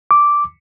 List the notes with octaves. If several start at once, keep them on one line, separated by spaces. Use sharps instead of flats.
D6